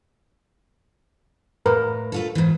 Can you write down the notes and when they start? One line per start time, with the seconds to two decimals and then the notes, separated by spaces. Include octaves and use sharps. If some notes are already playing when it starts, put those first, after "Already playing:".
1.66 A2 A#4 B4
2.12 A3 F4 A4
2.35 G#2 E3